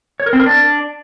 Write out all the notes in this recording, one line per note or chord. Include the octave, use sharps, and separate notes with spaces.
C#5
A#4
C4
A#4
D4